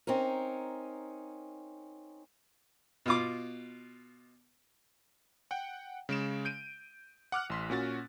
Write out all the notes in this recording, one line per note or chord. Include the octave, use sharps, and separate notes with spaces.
C4 C#4 D#4 A#4
B2 F4 D6
F#5 G5
C#3 G#3 D7 E7
G6 D7 D#7
F#5 D6 F6 F#6
A1 C6 B6
A#2 C#4 F#4 A6